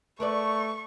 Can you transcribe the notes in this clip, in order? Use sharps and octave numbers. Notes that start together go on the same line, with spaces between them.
A3 A#4 B4 D5 C#6